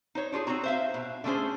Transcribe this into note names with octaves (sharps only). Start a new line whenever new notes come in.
D#4 C5 C#5
D4 F4 G4 G#4
C4 C#4 D#4 F#4 A#5
C5 E5 F5
B2
D3 A3 C#4 G#4 C5